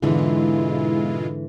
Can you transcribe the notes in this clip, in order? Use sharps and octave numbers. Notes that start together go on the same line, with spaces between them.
G#2 B2 D3 E3 G#3 E4 F4